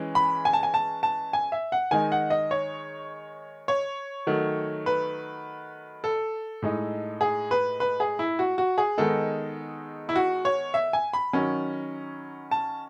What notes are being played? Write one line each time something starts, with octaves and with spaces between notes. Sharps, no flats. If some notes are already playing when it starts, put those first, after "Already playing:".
Already playing: E3 G#3 C#4
B5
G#5
A5
G#5
A5
A5
G#5
E5
F#5
D#3 G#3 D#4 G#5
F#5
D#5
C#5
C#5
D#3 F#3 A3
B4
A4
A2 G#3 D#4
G#4
B4
B4
G#4
E4
F#4
F#4
G#4
D#3 G#3 B3 D#4 A4
E4
F#4
C#5
E5
G#5
B5
D#3 F#3 C#4
A5